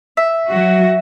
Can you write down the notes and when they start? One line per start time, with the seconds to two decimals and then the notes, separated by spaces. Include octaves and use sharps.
0.17 E5
0.48 F#3 F#4